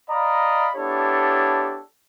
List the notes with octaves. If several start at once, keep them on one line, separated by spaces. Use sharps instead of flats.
D5 D#5 F5 A#5 B5
B3 D4 E4 G4 A4 C#5